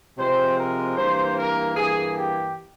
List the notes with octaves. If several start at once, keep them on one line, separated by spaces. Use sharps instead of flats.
C3 F3 G#3 C4 C5
A#4
G2 E3 A#3 C5
A#4
G2 E3 A#3 G#4
G4